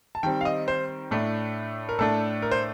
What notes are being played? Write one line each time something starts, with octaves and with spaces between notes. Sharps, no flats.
A5
D#3 G3 C4 G5
F5
D#5
C5
A2 A3 D4
A#4
A2 A3 D4 A4
A#4
C5